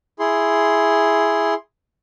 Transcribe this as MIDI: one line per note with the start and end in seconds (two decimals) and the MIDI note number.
0.19 1.54 64
0.19 1.54 68
0.19 1.54 84